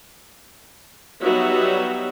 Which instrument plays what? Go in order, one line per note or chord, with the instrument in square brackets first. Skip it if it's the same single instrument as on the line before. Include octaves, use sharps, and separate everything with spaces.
[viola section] F#3 G3 B3 D#4 F#4 E5